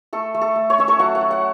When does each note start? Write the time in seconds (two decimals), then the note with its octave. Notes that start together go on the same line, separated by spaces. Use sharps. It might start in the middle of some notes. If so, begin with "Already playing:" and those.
0.13 A3 A4
0.34 A3
0.41 A4
0.56 A3
0.70 C#5
0.78 C#4 E5
0.88 A4 C#5
0.99 F#3 F#5
1.15 F#5
1.21 F#3
1.31 F#5